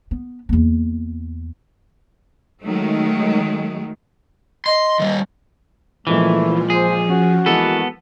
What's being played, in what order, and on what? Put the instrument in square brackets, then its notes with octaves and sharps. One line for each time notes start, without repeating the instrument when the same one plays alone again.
[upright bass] B3
E2 A#3
[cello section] D#3 F#3 G#3 A3
[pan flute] D#5 [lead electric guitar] C6
[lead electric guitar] D#3 G3
[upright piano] C#2 A#2 [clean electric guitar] E3 [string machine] F3 [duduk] A3
[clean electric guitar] G#4 [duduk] C5
[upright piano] C#4 [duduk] F#4
[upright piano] E3 G#3 A#3 [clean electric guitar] B3 A4